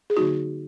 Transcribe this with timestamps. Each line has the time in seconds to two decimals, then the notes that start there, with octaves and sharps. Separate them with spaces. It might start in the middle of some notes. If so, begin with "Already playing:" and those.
0.10 G#4
0.16 D3 F#3 A#3 D#4 F#4